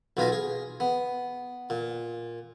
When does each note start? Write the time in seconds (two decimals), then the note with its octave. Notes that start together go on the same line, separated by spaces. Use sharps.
0.17 B1 B2 F4 B4 G#5 A#5
0.32 G#4
0.80 B3
1.70 A#2